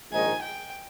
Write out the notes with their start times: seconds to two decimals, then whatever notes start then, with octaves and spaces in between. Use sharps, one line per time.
0.12 A#1 G#2 D#3 G#3 D#4 G#5
0.42 G5